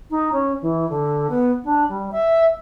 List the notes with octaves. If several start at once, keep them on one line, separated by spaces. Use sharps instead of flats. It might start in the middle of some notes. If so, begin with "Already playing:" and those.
D#4
C#4
E3
D3
B3
D4
G3
E5